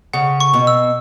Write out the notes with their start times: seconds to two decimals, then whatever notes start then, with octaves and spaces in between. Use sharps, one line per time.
0.13 C#3 F#5
0.40 C#6
0.53 B2
0.67 E6